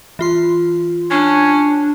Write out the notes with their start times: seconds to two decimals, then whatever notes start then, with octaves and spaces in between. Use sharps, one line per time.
0.19 E3 F4 C6
1.11 C#4 D4